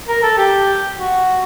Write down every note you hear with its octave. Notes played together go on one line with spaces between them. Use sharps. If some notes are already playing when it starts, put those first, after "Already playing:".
A#4
A4
G4
F#4